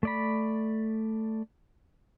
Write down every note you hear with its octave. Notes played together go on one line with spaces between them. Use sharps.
A3 D5 B5